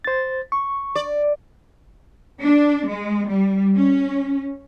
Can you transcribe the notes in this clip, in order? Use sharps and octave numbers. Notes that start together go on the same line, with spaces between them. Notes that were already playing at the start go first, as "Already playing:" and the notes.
C5 A6
C#6
D5
D4
G#3
G3
C#4